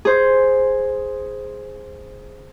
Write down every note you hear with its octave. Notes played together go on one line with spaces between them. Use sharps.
G#4 C5